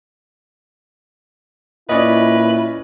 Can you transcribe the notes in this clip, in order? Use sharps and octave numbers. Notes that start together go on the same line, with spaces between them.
A#2 C#4 E4 B4 D5 D#5